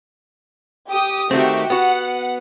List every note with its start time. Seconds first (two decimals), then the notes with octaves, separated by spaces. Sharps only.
0.89 G4 D#6
1.31 D#3 A3 C4 F#4 G4 E5
1.70 B3 F#4 F#5